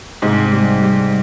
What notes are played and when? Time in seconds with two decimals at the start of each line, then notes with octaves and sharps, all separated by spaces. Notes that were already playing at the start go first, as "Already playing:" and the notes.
0.22 G#2 C3
0.52 G3
0.82 G3